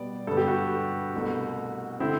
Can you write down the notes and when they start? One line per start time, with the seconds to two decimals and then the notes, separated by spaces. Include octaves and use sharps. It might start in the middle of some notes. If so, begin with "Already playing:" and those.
Already playing: B2 G3 B3 D5
0.27 G2 D3 G3 B3 A4
0.37 G4
0.48 F#4 A4
1.14 C2 B2 A3
2.00 D3 A3 C4 E4